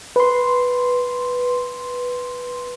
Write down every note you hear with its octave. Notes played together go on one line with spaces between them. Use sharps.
B4 C6